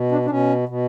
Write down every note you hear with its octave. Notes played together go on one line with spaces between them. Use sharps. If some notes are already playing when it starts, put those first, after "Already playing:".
Already playing: B2
D4
D4
B2 C#4
B2